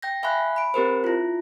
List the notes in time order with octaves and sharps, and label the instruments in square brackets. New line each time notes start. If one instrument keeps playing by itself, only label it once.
[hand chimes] G5 G6 A#6
E5 F5 G#5 B5 C6 F#6
B5 D7
C4 G4 A#4 C5
E4 F4